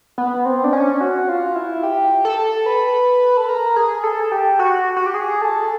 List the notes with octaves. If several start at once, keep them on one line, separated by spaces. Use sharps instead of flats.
B3
C4
D4
C#4
F#4
F4
E4
G4
A4
B4
A4
A#4
G#4
A4
G4
F#4
F#4
G4
G#4
A4